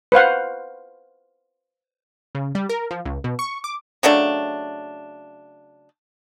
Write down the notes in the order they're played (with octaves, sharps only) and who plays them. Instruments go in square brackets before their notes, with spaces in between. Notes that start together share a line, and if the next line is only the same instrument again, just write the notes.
[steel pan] B4 C5 F5 F#5
[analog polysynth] C#3
G3
A#4
F3
C#2
B2
C#6
D6
[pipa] C#3 F#3 A3 D4